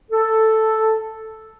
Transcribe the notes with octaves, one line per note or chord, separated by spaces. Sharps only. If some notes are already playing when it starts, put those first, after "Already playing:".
A4